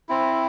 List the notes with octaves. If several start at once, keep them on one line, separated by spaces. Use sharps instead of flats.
C4 E4